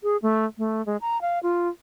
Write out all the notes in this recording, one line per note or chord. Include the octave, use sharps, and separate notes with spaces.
G#4
A3
A3
G#3
A#5
F5
F4